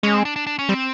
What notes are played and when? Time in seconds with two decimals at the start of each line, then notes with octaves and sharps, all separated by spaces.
0.03 G#3 C#4
0.14 C4
0.25 D4
0.36 D4
0.47 D4
0.59 C#4
0.69 G3 C4